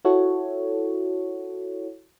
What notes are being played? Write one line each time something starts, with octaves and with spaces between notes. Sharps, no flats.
E4 F#4 A4 C#5